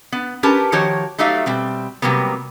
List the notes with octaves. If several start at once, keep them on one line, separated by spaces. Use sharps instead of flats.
B3
C#4 G4 A#4 B4 A5
D#3 F3 F#4 G4 C#5
F#3 A3 D#4 G4 E5 F5
B2 G3 C4
C3 F#3 G3 A#3 B3